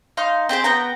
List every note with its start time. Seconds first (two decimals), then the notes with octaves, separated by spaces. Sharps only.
0.17 D#4 F5 C6
0.49 C4 G4 G#4 C5
0.64 B3 G5 A#5